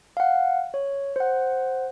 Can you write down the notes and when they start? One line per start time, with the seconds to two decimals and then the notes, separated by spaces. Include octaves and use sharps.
0.17 F5 F#5
0.74 C#5
1.16 C5 F#5